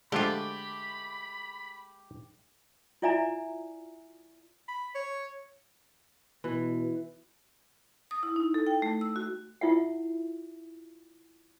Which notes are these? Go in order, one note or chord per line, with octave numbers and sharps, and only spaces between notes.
D3 F3 G#3 A3 F4 G4 B5 D6
E4 F4 D5 E5 G#5 A#5
B5
C#5
B2 E3
D#6
E4
D#4
A4
G5
A3
E6
F#4
E4 F4 E5 F#5